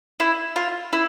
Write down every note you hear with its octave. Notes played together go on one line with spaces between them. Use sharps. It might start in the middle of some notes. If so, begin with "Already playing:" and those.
E4
F4
E4